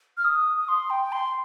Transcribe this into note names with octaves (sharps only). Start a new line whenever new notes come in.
F6
D#6
D#6
C6
G5
C6